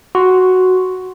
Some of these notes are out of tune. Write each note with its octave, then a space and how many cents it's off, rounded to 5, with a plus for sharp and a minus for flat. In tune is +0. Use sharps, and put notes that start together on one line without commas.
F#4 +0 C6 +0